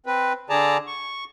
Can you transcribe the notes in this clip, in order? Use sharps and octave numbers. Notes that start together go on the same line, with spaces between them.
C4 B4
D3 G#4 D5 A5 A#5
C#6